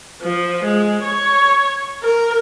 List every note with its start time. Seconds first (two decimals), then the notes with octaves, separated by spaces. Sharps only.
0.22 F3
0.64 G#3
1.02 C#5
2.03 A#4